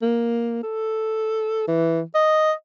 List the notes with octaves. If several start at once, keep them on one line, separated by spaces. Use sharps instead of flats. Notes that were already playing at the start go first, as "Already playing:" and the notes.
A#3
A4
E3
D#5